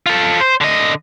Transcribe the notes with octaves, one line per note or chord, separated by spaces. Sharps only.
F4 A4
C5
D3 D#5